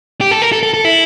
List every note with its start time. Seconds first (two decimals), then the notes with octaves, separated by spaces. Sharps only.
0.21 G4
0.31 A4
0.42 A#4
0.52 A4
0.63 A4
0.74 A4
0.85 E4